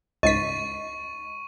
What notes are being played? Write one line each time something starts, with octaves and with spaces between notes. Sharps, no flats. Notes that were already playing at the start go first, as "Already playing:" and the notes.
C#2 G#2 D#5 C#6 B6 D#7